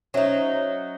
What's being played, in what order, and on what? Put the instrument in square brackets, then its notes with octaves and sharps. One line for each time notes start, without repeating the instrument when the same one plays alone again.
[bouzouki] F#3 D#4 [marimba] C#4 C5 E5